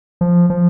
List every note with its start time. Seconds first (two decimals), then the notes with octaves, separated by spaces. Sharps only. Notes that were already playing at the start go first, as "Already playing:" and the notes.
0.21 F3
0.50 F3